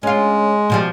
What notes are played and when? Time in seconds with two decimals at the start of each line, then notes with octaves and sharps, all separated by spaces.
0.03 G#3 C#4 F4
0.70 B2 F3 G3